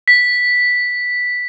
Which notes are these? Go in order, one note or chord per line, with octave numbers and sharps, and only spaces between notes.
B6